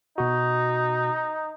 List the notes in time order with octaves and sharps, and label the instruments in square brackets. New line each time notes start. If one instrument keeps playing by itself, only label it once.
[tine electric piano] B2 F#4 [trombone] D#4